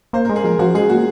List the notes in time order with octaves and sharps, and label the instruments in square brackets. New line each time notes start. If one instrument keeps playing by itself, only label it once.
[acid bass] A#3 [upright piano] C5
[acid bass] G#3 [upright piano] A#4
[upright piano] G#4
[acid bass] F3 [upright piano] A#4
[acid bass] F3 [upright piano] F#4
[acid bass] G#3 [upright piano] G#4
[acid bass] A#3 [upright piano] F#4